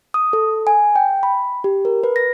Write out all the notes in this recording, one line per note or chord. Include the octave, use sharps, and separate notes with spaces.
D#6
A4
G#5
G5
B5
G4
A#4
B4
A#6